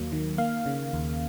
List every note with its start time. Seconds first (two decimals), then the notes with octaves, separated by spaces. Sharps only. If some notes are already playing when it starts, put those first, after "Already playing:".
Already playing: D#2 D#3 F#3 A#3
0.12 D#3
0.38 A#3 F5
0.66 C#3
0.93 D#2